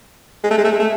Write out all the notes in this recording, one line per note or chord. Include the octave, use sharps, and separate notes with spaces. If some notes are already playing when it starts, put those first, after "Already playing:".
G#3
A3
G#3
A3
G#3
A3